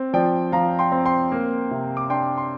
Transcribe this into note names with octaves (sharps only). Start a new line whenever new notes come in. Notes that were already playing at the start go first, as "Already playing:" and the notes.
Already playing: C4
F3 D5 G5
F3 F5 A#5
G5 C6
C4
G5 C6
A#3
C3
D6
D4 G5 C6
C6